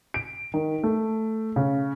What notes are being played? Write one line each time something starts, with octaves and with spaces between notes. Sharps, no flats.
D7
D#3
A3
C#3